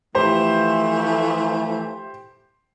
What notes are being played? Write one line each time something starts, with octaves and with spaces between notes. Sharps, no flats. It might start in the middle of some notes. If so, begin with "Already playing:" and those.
E3 F3 A3 G4 C5